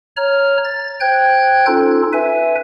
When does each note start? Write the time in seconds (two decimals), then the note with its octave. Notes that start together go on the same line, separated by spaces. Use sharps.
0.17 C#5 A#5 F6
0.65 A6
1.01 C5 G5 F#6 G#6
1.67 C#4 D#4 F4 A4
2.13 B4 E5 G#5